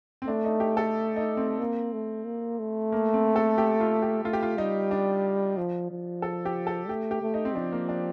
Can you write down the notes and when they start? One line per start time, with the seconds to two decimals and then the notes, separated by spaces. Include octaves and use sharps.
0.22 C4
0.28 A3 D4
0.45 D#4
0.60 G4
0.77 A4
1.16 D#4
1.37 C4
1.60 A#3
1.93 A3
2.26 A#3
2.59 A3
2.92 A#3
3.14 C4
3.36 A4
3.58 G4
3.80 F4
4.02 G4
4.24 A3 F4
4.33 G4
4.43 F4
4.57 G3 D#4
4.91 D4
5.57 F3
5.91 F3
6.22 A4
6.45 G4
6.67 A4
6.89 A3 G4
7.11 G4
7.22 A3
7.34 D#4
7.45 C4
7.55 F3 D4
7.72 A#3
7.89 D4